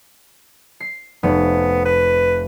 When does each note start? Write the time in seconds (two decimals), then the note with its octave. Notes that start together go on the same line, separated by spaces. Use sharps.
0.80 C7
1.23 F1 B3
1.85 B4